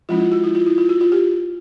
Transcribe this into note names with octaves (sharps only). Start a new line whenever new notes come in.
F3 G#3 C#4 E4 F4
F4
F#4
E4
F4
E4
F4
F#4
F4
G4